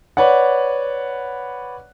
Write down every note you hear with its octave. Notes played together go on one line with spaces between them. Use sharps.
B4 C#5 D5 F#5